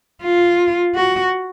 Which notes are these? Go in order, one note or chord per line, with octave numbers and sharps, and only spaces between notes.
F4
F#4